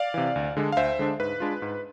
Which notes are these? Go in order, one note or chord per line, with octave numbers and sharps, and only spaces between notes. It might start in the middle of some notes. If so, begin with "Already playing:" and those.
Already playing: D5 F5
C3 E3
D2
D3 G#3 D4
F5
D2 C5 E5
D3 G#3 D4
G#2 B4
G#3 D4 F4
G#2